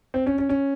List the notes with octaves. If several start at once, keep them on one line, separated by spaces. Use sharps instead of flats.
C4
C#4
C#4
C#4